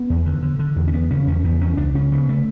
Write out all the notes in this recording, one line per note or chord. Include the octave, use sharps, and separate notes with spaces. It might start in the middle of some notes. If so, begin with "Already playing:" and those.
Already playing: B3
E2
D3
D3
D3
E2
C#4
E2 B3
C#3 C#4
E2 C#4
E2 B3
E2 C#4
C#2 D4
C#3 C#4
C#3 B3
C#3 A3